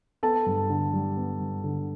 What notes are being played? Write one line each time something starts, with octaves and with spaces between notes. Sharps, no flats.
B3 A4 A5
G2
D3
G3
B3
G2
D3